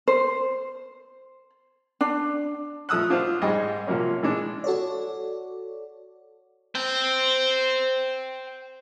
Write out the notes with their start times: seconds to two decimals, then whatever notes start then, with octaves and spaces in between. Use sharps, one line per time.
0.08 C5
2.01 D4
2.89 F3 A3 D#6 E6 F#6
3.10 D4 F4 F#4 C5
3.42 G#2 G3 G#4 D#5 G5
3.87 C3 F3 F#3 A#3 C#4
4.23 E3 G#3 D4
4.64 F#4 A4 C#5 D5
6.75 C5 G5